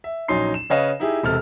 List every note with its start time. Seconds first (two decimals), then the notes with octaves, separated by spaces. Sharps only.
0.04 E5
0.28 A#1 F#3 C#4 D#4 C6 C7
0.54 E7
0.70 C#3 B4 C#5 D#5 F5 E7
1.00 D#4 E4 G4 G#4
1.23 E1 C3 A4 F6